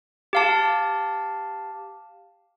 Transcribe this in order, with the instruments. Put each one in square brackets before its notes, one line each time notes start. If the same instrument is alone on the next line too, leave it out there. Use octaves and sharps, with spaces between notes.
[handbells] G4 F5 A5